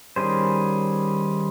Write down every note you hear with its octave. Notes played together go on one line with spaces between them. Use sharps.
D#3 G3 C#4 G#4 C5